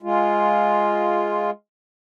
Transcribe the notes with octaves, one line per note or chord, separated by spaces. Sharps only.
G#3 F4